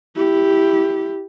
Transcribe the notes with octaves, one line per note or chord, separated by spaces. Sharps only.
E4 G4